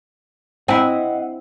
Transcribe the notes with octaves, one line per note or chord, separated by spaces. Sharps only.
C4 E4 D#5 F#5